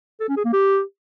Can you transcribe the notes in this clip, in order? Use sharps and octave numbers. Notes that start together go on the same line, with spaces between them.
A4
C#4
G#4
A#3
G4